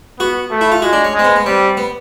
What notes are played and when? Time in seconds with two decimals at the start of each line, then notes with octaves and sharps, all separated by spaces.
0.19 B3 F#4
0.51 A3
0.61 E4
0.72 F4
0.82 G#3 F#4
0.93 D4
1.04 C#4
1.14 G#3
1.19 C4
1.25 B3
1.36 B3
1.46 G3 C4
1.77 B3